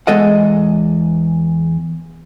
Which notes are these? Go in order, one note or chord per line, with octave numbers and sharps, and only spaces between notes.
E2 G#3 A4 D#5 F#5